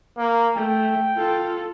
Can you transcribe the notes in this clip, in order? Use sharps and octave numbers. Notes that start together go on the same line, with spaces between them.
A#3
A3 G5
F4 A4